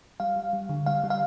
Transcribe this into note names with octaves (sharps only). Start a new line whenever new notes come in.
G3 F5
G3
G3
D3
G3 F5
G3
F5